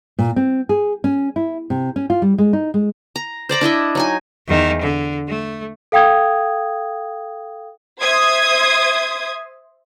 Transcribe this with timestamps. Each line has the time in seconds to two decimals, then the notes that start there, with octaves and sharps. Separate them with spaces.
0.19 A#2
0.36 C4
0.69 G#4
1.04 C#4
1.36 E4
1.70 C3
1.96 C#4
2.10 F4
2.22 G3
2.38 G#3
2.53 D#4
2.74 G#3
3.16 A#5
3.49 C5 D5 A#5 B5
3.61 D4 E4 D#5 E5
3.95 F#3 D#4 G#5
4.47 E2 D#3
4.82 D3
5.28 A3
5.92 A4 F5 G5 D#6 G#6
8.01 C5 E5 C6 D#6 G#6